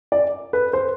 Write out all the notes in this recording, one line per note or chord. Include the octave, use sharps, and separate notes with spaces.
D5
B4
C5